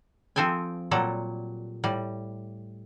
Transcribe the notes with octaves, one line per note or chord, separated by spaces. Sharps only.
F3 C4 A4 G5 G#5
A#2 F#3 G3 A4
A2 G3